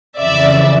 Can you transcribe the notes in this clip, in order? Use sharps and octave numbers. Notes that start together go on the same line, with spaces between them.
F2 C#3 E3 D5 E5